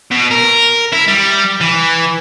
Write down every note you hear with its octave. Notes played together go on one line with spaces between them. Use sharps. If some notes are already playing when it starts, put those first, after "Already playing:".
B2
A#4
E4
G3
E3